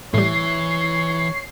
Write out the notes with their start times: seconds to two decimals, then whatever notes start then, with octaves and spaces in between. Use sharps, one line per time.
0.14 A2 E3 G3 C#5 C7